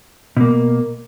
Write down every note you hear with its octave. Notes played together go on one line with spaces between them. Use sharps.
B2 A#3